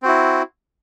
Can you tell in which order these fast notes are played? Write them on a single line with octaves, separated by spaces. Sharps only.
C4 F#4 E4